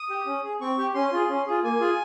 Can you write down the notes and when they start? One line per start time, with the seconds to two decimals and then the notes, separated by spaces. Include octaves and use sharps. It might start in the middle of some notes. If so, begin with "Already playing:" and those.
Already playing: D#6
0.10 G4
0.26 C#4
0.43 G#4
0.61 C4 C#6
0.78 G4
0.95 C#4 C6
1.12 F4 G#4
1.29 C#4
1.46 F4 G#4
1.63 A#3 G#5
1.80 F4 G#4